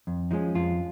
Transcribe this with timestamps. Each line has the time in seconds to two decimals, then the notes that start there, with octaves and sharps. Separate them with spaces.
0.07 F2
0.31 F3 G#3 C#4 D#4
0.55 F2 F4